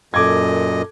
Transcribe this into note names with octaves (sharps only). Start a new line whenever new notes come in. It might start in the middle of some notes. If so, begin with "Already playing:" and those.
F#2 A#2 A4 D#5 D6 G#6